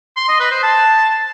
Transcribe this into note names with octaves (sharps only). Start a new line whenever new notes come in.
C6
D#5
B4
C5
A5